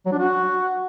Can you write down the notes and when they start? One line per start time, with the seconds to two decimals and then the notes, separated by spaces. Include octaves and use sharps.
0.06 F#3
0.12 D4
0.19 F#4